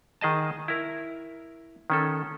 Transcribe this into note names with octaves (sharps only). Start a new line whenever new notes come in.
D#3 G#4 D#5 A5
E4 A#4
D#3 C#4 A4